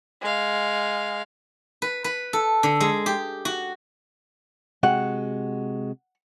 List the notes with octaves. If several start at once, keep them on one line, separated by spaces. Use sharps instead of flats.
G#3 F5
B4
B4
A4
D3
G#3
G4
F#4
C3 G#3 F#4 F#5